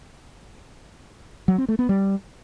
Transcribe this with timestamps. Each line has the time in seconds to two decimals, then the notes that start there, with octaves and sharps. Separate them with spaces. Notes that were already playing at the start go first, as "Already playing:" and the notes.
1.48 F#3
1.58 C4
1.68 A3
1.79 B3
1.89 G3